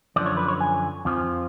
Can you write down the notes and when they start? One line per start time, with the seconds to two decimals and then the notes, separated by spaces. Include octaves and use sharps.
0.16 F#2 D3 F3 D5
0.26 C#5
0.37 B4
0.48 C#5
0.61 G#5
1.05 F2 F3